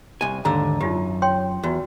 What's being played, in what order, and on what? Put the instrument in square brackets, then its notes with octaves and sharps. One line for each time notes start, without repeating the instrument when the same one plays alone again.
[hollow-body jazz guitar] C2 G#5
[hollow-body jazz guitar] D#2 G#2 D3 [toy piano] A#5 E6
[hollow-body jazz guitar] F#2 [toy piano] D#4 F4 G4
[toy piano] C#5 G5 C6
[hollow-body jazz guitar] E2 [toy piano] F#4